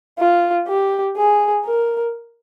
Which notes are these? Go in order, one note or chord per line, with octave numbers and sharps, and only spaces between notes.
F4
G4
G#4
A#4